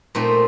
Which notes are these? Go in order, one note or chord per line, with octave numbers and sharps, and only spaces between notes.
A#2 A3 C4 D#4